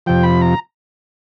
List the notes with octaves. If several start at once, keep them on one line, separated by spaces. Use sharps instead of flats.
F2 C3 F3 G5
B5
A#5